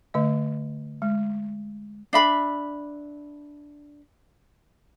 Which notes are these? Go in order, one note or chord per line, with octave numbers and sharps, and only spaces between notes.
D3 A3 D#5
G#3
D4 E5 B5